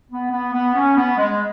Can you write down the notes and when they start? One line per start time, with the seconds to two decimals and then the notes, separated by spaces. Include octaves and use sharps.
0.10 B3
0.32 B3
0.53 B3
0.75 C#4
0.97 B3
1.18 G#3